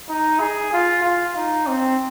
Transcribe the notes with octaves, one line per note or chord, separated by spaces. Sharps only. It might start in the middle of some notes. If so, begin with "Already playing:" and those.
D#4
G#4
F4
F4
D#4
C4